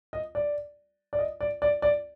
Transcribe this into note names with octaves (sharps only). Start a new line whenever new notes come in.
D#5
D5
D5
D#5
D5
D5
D5